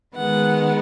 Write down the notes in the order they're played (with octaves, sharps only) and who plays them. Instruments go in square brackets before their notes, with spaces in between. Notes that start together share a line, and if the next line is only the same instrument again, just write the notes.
[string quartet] D#3 G#3 B3 F#5